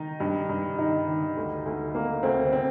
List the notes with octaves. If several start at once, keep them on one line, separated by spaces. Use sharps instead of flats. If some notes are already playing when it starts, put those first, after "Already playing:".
Already playing: D#3 D#4
G2
G2
D#3 D#4
D#3
D2
D2
D2 A#3
D2 C4
C4